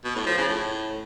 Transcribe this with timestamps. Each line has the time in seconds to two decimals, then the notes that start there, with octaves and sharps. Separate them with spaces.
0.04 B2
0.15 A2
0.26 F3
0.37 C#3
0.48 A2